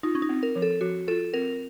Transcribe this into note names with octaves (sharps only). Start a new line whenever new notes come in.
D#4 F4
C#4
D#4
C4
A#4
F3
A4
F3 F#4
F4 A4
C4 A#4